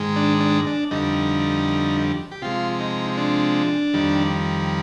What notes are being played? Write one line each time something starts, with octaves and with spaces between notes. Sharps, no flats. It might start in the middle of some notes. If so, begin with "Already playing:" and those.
Already playing: G#2 D#3 G#3
D4
D4
D4
F2 D3 G3 D#4
G4
C3 F3 G#3 F4
D#4
D4
F2 D#3 G3